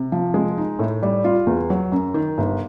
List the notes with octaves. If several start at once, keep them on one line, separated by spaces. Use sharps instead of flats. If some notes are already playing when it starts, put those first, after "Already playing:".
Already playing: C3
F3
G#3
D#4
A2
G3
F4
E2
F#3
F#2
D#3
G1